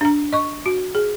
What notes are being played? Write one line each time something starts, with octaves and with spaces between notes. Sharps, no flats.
D4 A#5
D#5 C#6
F#4
G#4